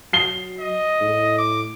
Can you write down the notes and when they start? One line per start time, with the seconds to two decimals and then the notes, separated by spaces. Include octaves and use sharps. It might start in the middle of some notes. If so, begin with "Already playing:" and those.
0.13 F#3 C7 G7
0.60 D#5
1.00 A2
1.38 D6